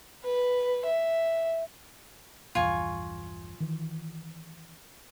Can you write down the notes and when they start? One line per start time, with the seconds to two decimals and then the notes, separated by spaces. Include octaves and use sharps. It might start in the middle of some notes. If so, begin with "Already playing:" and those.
0.24 B4
0.86 E5
2.55 A#1 E2 G2 F4 G#5 C#6
3.60 D#3 E3